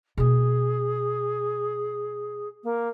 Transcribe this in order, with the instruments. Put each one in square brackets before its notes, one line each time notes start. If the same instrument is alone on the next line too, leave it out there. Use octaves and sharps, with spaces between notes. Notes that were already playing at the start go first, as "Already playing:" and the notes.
[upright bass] B2 A#3 [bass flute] G#4
[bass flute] A#3